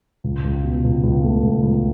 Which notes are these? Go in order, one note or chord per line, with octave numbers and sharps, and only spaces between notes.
C#2
C#2
B2
C#2
C#2
A3
C#2
C#2